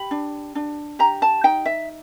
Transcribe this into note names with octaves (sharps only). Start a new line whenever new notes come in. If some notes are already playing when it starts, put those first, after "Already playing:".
Already playing: G4 B5
D4
D4
G4 A#5
A5
D#4 G5
E5